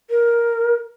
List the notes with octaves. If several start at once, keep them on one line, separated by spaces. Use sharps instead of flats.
A#4